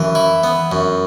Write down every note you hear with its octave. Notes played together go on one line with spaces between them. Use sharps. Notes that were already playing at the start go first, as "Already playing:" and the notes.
Already playing: F#2 E3
E4
B3
F#2